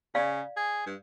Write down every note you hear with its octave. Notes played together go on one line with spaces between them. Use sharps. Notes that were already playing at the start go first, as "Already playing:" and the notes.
C#3 D5 F5
G#4
G2